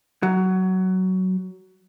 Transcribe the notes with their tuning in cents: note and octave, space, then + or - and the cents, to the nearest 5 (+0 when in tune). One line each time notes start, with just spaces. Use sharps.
F#3 +15